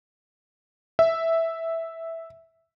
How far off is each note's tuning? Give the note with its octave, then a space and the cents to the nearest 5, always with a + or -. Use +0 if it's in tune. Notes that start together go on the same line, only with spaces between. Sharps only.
E5 -5